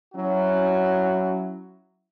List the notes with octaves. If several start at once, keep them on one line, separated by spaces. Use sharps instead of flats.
F#3 C#4 E4 F#4